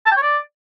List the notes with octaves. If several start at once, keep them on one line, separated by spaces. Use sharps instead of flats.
A5
G5
C#5
D5